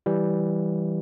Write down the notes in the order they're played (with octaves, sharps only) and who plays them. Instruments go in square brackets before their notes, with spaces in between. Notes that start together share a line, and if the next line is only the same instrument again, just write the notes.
[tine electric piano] E3 G3